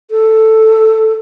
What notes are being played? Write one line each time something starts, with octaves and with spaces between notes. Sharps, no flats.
A4